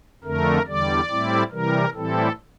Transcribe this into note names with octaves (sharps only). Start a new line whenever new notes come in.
F2 D3 A3 A#4
E2 D3 G3 D5
A2 G3 C4 E4
C3 E3 G3 A#4
A2 E3 G3 C4 E4 A4